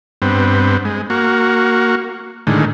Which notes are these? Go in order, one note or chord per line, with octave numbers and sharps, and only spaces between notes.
G2 B3 C4
G#3
A#3 F#4
A2 D3 D#3 G#3